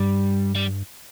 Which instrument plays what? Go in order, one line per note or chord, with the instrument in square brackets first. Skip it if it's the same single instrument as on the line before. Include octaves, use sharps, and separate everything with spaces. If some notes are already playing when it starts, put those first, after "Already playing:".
Already playing: [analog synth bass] G2 [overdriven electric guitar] G3
[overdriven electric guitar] G3